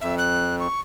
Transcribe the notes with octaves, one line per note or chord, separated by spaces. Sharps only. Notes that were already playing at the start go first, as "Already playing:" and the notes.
F2 E5
F#6
C#6